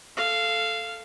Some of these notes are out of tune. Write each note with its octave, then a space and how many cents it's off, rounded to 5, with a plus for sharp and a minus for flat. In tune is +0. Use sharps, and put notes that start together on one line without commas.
A4 +0 F5 -15